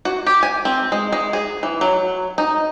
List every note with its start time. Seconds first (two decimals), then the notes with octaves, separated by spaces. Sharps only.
0.05 F#4
0.27 G4
0.43 G#5
0.65 C4
0.92 G#3
1.12 G#3
1.33 G#4
1.63 E3
1.81 F#3
2.38 D#4